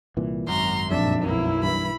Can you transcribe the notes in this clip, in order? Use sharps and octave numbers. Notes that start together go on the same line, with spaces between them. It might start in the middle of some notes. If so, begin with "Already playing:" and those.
C2 A#2 E3
G#1 F#2 A#5 C6
A#1 F2 G#2 D4 E5
B1 A#3 E4
G2 E3 B5